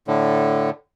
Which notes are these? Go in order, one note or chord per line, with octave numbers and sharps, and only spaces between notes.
A2 D3